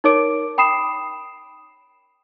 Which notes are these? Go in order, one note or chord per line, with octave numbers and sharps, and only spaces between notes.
D#4 A#4 C#5 D6 D7
G5 B5 D#6 C7 E7